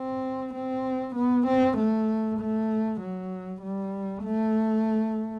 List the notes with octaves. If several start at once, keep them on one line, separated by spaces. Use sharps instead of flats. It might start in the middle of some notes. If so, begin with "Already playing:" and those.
Already playing: C4
C4
B3
C4
A3
A3
F#3
G3
A3